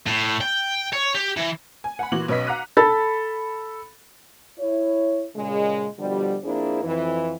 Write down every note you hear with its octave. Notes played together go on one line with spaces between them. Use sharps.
A2
G5
C#5
G4
E3
G#5
F#5 G#5 B5
A#2 E3 F#4 D6 F#7
B1 C#4 B4 D#5 B6
F5 F#5 A#5 D6 F#6 D#7
A4 B5 A6
E4 C#5
A#2 C#3 G#3
B2 D3 F3 G3
F2 A#3 D4 E4 G#4 C5
F2 E3